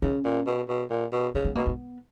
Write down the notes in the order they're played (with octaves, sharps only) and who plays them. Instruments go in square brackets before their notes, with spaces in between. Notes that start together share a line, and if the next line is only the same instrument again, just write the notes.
[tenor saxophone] C#3 [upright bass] C#4
[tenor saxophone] A#2
B2
B2
A#2
B2
[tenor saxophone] C#3 [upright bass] C#4
[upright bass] B3
[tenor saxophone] B2 [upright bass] A#3
[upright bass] B3